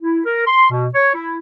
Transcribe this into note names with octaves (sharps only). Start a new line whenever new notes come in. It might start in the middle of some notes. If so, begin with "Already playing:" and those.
E4
A#4
C6
B2
C#5
E4